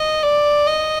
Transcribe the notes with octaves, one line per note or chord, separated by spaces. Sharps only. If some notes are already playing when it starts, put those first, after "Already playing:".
Already playing: D#5
D5
D#5